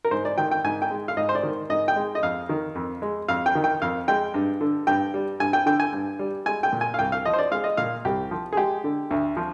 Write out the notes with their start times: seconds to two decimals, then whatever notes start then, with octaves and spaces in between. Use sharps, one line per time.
0.05 A#4
0.11 G#2 C5
0.25 D5
0.38 D#3 G5
0.51 G5
0.64 G#2 G#5
0.82 G5
0.90 G#3
1.08 F5
1.17 G#2 D#5
1.29 C5
1.35 D5
1.43 D#3
1.70 G#2 D#5
1.88 G5
1.96 G#3
2.15 D#5
2.22 F2 F5
2.49 D#3
2.75 F2
3.02 G#3
3.28 F2 F5
3.46 G5
3.55 D#3
3.64 G5
3.82 F2 F5
4.08 G#3 G5
4.34 G2
4.61 D3
4.87 G2 G5
5.14 G3
5.40 G2 G#5
5.53 G5
5.66 D3 G5
5.80 G#5
5.93 G2
6.19 G3
6.46 G#3 G#5
6.63 G5
6.73 A#2
6.81 G#5
6.94 F5
6.99 C2 G5
7.12 F5
7.25 F3 D#5
7.33 C5
7.39 D5
7.51 G#3 F5
7.64 D#5
7.77 A#2 F5
8.05 C2 G4
8.31 F3
8.53 G#4
8.57 G#3 G4
8.84 D3
9.11 D2
9.37 F3